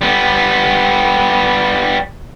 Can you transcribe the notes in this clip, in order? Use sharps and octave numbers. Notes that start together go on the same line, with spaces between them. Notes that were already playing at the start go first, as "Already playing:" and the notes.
G3 B3